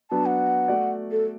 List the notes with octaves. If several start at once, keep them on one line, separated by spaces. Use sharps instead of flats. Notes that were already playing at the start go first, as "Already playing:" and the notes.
F#3 B3 D4 A5
F#5
A3 F#4 D5
A4